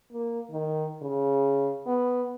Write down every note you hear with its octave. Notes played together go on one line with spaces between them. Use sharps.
A#3
D#3
C#3
B3